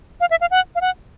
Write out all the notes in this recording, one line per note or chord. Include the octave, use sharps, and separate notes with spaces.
F5
E5
F5
F#5
F5
F#5